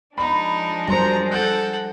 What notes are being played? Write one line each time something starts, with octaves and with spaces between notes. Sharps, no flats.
F3 G#3 D4 D#4 A#5 B5
F#2 G3 C5 A#5 C6 C#7
A4 F#5 F#6 G6 D7